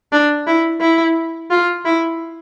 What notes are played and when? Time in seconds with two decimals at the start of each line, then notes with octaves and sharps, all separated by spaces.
0.12 D4
0.47 E4
0.81 E4
1.50 F4
1.85 E4